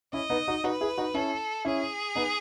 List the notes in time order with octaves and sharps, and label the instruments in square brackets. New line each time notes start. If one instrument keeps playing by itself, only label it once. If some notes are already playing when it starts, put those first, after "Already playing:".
[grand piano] C#4 E4 [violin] D#5
[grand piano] B3 D#4
D#4 F#4
[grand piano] D#4 F#4 [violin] B4
[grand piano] E4 G#4
D#4 F#4
[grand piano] C#4 E4 [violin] A4
[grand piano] C#4 E4 [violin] G#4
[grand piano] B3 D#4